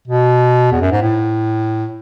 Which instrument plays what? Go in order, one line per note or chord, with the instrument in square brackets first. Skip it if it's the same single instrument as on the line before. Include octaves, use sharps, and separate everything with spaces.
[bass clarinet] B2
E2
F#2
G#2
A2